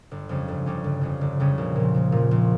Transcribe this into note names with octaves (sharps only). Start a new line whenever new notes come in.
G1
F2 C#3 G3 C#4
G1
F2 C#3 G3 C#4
G1
F2 C#3 G3 C#4
G1
F2 C#3 G3 C#4
A#1
A#2 F3
A#1
A#2 F3
A#1